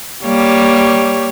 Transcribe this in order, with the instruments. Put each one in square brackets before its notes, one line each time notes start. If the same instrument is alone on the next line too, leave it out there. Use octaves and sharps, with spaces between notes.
[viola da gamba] G3 A#3 C#5